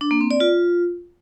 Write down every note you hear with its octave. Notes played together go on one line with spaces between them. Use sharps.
D4
A#3
C4
D5
F4